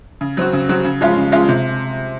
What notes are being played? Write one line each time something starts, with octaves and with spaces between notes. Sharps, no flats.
C#3
F#3 C4 F#4
C#3
F#3 C4 F#4
C#3
F3 G#3 C#4 F4
C#3
F3 G#3 C#4 F4
C3